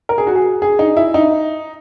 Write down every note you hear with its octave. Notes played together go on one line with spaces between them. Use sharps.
A#4
G#4
F#4
G#4
G#4
D#4
E4
D#4